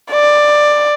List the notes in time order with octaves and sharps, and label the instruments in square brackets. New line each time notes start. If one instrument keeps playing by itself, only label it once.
[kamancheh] D5